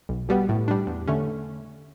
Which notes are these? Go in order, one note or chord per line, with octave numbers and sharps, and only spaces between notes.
B1
B2 G3 B3
A2
G3 D4
E2
D3 A3 C#4